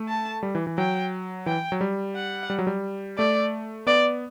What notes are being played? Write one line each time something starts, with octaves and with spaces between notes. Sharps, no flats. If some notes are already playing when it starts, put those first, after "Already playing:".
Already playing: A3
A5
G3
E3
E3
F#3 G5
E3 G5
F#3
G3
F#5
G3
F#3
G3
A3 D5
B3 D5